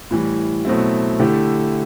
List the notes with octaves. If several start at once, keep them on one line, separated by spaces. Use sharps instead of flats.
A2 E3 G3
B2 F#3 A3 C4 E4
D3 A3 E4 G4